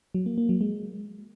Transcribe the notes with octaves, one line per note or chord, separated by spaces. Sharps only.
F#3
A#3
A#3
F#3
G#3